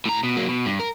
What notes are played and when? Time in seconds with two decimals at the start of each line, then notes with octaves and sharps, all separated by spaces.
0.06 A2 A#5
0.23 B2
0.37 F#3 A#3
0.48 B2
0.66 G2
0.80 A#4